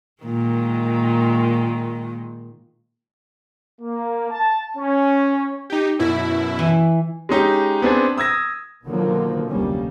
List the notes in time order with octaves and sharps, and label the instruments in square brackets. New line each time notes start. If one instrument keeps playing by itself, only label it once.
[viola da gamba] A#2 D#3 G#3
[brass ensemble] A#3
A5
C#4
[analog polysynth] D#4 G4
F#2 B2 E4
[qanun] E3
[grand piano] G#3 C#4 D#4 G4
B3 C4 D4 G#4
D#6 E6 G#6 A#6
[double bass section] B2 D3 D#3 F3 F#3 A#3
F1 D2 G3 A#3 C#4